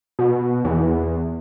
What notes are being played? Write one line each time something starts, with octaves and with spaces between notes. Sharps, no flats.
B2
E2